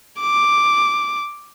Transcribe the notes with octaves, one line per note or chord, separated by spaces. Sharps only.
D6